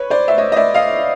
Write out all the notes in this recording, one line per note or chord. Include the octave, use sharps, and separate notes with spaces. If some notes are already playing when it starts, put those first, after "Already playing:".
Already playing: B4 C#5
C5 D5
E5
C#5 D#5
D#5
D5 E5
D#5 F5